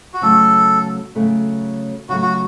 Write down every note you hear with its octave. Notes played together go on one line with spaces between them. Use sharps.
F#4
C#3 F#3 A3 A4
C#3 F#3 A3
C#3 F#3 A3 F#4
F#4